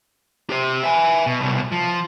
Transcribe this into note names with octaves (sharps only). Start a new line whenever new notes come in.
G4 C5
E5 G#5
B2
C2 B2
F3